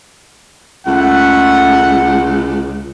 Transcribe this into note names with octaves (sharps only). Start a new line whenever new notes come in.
C#2 A3 F#5